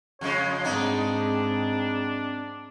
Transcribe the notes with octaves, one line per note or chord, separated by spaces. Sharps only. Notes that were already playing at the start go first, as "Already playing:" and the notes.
F2 C#3 G#3 C#5
G#2 G#3 B3 C4 D4 D#4